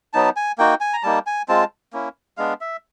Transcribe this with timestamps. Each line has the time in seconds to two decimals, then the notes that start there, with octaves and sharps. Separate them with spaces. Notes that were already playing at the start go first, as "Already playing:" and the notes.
0.13 F#3 B3 D#4 A5
0.36 G#5
0.58 A#3 D#4 F#4 G5
0.81 G#5
0.93 A#5
1.03 G3 A#3 D#4 A5
1.27 G#5
1.48 G#3 C4 F4 A5
1.93 A#3 C#4 E4
2.37 G#3 B3 D4 F5
2.61 E5